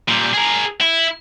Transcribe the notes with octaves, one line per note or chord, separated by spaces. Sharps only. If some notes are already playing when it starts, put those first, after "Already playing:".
A#2 G3
G#4 A#4
E4